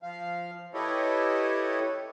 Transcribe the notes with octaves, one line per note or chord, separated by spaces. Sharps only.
F3 F5
E4 G4 A4 B4 C#5 D#5